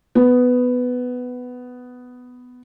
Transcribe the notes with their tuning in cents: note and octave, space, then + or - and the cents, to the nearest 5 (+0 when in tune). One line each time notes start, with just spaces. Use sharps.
B3 +10